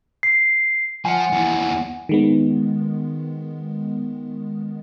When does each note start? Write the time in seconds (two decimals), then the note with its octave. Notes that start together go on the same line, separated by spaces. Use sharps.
0.23 C7
1.05 F3 F#5 G#5
1.32 D#2 E3
2.09 D#3 G#3 B3